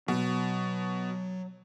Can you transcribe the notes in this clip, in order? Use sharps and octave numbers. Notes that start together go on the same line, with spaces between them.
B2 F#3